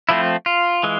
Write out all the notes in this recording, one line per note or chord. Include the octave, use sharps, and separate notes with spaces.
F3 A3 C4 E4
F4
E3 G#3